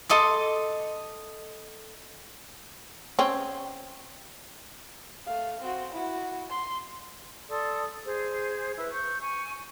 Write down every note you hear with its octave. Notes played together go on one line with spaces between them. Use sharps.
A4 D#5 C6 D6
C4 C#4
A3 F5
C4 F#4
E4 F#4
C6
A4 D5 C6 D#6
G#4 C5
E4 B4
C#6 G6
G#5 C#6